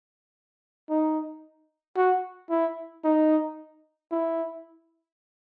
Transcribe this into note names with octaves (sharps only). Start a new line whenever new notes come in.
D#4
F#4
E4
D#4
E4